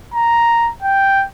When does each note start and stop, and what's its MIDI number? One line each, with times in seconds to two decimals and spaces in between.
0.14 0.71 82
0.82 1.25 79